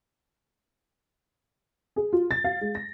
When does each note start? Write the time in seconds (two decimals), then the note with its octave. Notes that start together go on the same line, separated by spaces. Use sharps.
1.96 G#4
2.13 F4
2.31 A6
2.44 F5
2.61 G#3
2.75 A#6